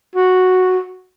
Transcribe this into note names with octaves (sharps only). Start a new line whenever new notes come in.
F#4